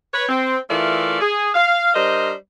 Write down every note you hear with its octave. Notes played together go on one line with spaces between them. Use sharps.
B4 C#5
C4
E3 A3 F4 A4 A#4 D5
G#4
F5
G3 D4 A#4 C5 D#5